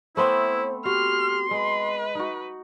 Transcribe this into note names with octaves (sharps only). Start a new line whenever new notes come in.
A3 B3 C4 E4 C5
F#4 G4 C6 F6
G#3 B4 D#5
D#4 F#4